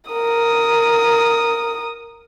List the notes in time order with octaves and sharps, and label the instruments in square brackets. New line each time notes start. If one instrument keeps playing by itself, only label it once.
[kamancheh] A#4 D#6